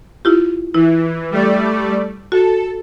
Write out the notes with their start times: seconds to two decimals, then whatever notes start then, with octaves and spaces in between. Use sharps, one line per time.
0.25 E4 F4 G4
0.74 E3 E4
1.31 G3 A3 D5
2.32 F#4 A4